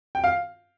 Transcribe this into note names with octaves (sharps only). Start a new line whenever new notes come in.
G5
F5